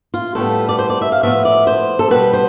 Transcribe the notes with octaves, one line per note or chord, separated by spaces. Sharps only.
F4
A2 G3 B3 A4
D5
C5
D5
E5
F5
A2 F3 B3 E5
D5
C5
A4
B2 G3 B3 B4
C5